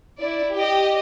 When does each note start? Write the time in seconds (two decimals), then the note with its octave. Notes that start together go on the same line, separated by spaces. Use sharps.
0.20 E4 D5
0.56 G4 D#5